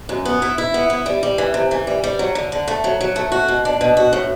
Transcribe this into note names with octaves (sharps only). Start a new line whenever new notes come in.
F#2
B3
E4
E4
B3
E4
G3
G3
E3
C3
E3
G3
G3
F#3
D3
D3
A3
F#3
F#3
A3
F#4
B2
D4
B2
F#4
A2